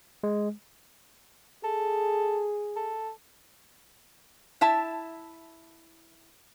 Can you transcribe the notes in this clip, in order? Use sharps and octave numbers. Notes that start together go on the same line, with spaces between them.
G#3
G#4 A4
A4
E4 E5 A5